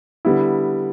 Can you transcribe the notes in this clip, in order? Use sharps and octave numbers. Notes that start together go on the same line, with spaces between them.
D3 G3 B3 E4